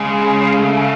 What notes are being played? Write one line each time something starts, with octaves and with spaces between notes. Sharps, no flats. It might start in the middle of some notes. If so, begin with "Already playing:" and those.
Already playing: C#3 G#3
A3